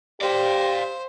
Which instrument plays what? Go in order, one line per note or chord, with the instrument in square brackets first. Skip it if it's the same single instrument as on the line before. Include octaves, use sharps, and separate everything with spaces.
[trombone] G4 [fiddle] C5 [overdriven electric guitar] D5 F5